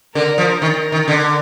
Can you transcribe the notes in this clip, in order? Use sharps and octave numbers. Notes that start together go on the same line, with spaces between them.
D3 A#4
F3
D#3 A#4
D#3
D3